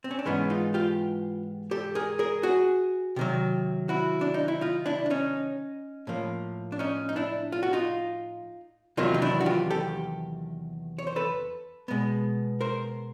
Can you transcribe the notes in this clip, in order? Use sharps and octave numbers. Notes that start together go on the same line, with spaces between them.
C4
C#4
D4
G#2 E3 G#3 B3 C#4 D#4
D#4 F4
F4 G4
G4 A4
G#4 A#4
G#4 A#4
F#4 G#4
C3 D#3 F#3
E4 F#4
D4
D#4
E4
D#4 F4
D4 E4
D4
C#4 D#4
A2 F3 A#3
D4
C#4 D#4
D#4
D4 E4
F4
F#4
D#4 F4
E2 C3 D#3 F#3 A#3 D#4 F4
D#4
D4 E4
F#4
F4 G4
G4 A4
C#5
C5
A4 B4
B2 G#3 B3
A#4 C5